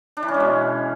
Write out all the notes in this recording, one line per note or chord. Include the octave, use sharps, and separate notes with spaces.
D4
E3
C#4
G#3
B2